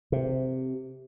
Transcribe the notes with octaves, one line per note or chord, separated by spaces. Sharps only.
C3